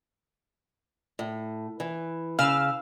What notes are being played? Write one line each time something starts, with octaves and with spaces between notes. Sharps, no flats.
A2
E3
C#3 F5 E6 F6